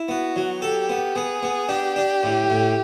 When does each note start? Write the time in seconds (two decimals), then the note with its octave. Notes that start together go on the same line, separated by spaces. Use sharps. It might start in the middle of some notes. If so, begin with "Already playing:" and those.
Already playing: E4
0.08 B3 F#4
0.36 F#3
0.62 G4 A4
0.89 B3
1.16 B3 G#4
1.43 B3
1.69 D4 G4
1.96 D4
2.23 A2
2.50 A2